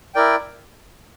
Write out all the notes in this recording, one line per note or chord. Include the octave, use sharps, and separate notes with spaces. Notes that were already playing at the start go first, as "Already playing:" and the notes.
E4 A#4 D5 G5